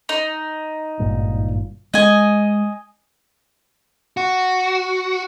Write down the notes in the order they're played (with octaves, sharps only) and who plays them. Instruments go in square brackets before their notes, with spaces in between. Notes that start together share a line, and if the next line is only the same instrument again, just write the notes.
[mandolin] D#4
[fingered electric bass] G#1 G2 A#2
[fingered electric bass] G#3 [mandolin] D#5 G#5
[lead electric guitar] F#4